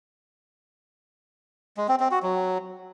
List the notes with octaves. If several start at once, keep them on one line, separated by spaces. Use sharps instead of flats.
G#3
C4
C4
F#4
F#3